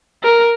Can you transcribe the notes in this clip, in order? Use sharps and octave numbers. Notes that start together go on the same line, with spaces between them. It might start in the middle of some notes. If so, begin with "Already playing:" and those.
A#4